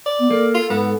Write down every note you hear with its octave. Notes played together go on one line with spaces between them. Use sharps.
D5
B3
A#3 A4
F4
G#2 B3